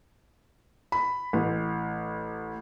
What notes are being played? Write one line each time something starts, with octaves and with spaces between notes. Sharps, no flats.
B5
A1